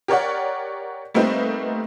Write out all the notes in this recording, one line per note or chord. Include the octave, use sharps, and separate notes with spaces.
G4 A#4 C#5 D5 F#5
G3 A3 A#3 C4 D#4 B4